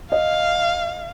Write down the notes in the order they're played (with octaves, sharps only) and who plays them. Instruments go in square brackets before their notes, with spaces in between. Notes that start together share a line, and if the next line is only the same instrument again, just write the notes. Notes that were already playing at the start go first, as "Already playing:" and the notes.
[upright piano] D#5 [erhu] F5